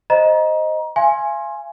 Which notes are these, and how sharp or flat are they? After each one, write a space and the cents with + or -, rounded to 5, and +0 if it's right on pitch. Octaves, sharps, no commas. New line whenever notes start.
C5 +0 D#5 +0 A#5 +25
F5 -40 G#5 +0 C6 +25